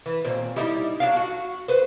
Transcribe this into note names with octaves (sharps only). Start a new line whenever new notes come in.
E3
D#2 A#2 C4
G3 D#4 E4
F#3 D4 F5
F#4
B4 C5